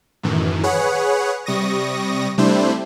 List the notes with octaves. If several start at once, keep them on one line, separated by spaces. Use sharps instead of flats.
F#2 A2 D#3 E3
G#4 B4 C#5 F#5
C3 G3 C#6 D#6 A#6
C3 G3 A3 D4 E4 C5